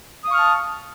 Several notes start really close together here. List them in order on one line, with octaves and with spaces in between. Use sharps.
D#6 F5 C#6 F6 A5